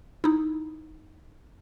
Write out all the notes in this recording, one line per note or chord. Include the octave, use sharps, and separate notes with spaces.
D#4 E4